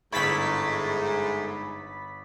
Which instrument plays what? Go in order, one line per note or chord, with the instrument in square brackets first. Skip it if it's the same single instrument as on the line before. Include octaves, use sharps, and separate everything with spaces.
[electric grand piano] G1 C#6 [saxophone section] G#2 [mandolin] A3 E4 [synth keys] B5 A6 B6